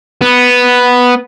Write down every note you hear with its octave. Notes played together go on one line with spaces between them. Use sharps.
B3